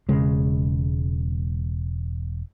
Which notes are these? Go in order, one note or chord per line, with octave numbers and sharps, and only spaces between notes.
E1 C#3 G#3